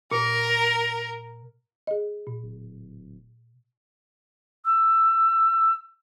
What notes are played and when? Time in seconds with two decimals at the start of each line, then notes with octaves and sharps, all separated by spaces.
0.11 A#2 A#4
1.87 G#4 D#5
2.27 A#2
2.43 D1
4.65 E6